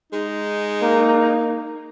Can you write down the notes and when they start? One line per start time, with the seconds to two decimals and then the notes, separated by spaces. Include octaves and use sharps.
0.13 G#3 D#4
0.82 A#3